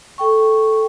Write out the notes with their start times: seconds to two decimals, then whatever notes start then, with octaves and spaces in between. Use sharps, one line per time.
0.18 A4 G5 C#6